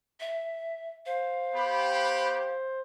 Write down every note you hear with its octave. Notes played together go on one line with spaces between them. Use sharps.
E5
C5 F5
B3 G4 B5